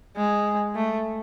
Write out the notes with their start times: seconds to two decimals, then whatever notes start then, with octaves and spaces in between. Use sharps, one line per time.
0.16 G#3
0.75 A3